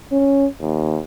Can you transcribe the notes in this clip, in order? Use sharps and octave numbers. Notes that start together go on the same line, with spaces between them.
C#4
D#2